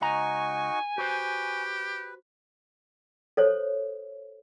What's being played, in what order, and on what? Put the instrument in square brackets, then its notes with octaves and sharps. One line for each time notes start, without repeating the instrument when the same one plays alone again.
[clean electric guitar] C#2 D#5 A#5 [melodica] D#4 F#4 C#6 [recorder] G#5
[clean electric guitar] F#4 C5 [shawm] G4 [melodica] B4
[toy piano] A4 C5 C#5